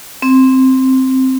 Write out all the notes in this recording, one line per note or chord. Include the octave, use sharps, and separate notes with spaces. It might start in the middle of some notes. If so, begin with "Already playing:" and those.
C4